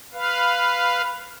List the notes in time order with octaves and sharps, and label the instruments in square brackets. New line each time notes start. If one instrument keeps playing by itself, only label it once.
[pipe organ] B4 F5